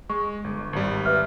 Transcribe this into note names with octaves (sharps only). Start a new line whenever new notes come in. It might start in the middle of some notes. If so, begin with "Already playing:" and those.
G#3 C#6
G1
G#1 G3
B4 E5 F6